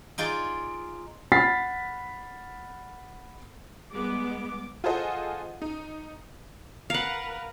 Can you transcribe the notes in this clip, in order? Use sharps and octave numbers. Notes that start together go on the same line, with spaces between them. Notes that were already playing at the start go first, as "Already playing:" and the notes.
D#4 F4 G#4 D5
F#5 B5 F6 A6 B6 C7
G3 G#3 B3 D6
F4 G#4 A4 C5 D#5 F#5
D#4
A#4 B4 F5 F#5